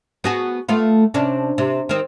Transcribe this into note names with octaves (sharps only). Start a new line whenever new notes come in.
B3 F#4 G#4
A3 B3 F4
C3 C#4 D4
C3
D#3 C4